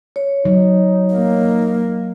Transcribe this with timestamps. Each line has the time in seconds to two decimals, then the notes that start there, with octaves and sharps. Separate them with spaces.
0.16 C#5
0.45 F#3 D#4
1.14 A#3